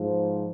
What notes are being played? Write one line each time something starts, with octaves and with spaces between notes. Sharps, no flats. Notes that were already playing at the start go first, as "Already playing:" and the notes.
Already playing: G#2 F3